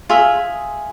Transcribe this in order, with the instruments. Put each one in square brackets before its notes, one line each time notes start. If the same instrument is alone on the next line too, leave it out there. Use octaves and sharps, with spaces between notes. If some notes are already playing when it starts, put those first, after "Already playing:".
[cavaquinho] F4 G#4 E5